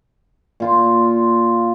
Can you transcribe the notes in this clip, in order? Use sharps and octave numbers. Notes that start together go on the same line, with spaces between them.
A#2 F4 C6